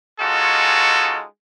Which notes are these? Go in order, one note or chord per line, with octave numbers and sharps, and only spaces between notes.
G#3 C#4 D#4 F4 F#4 A4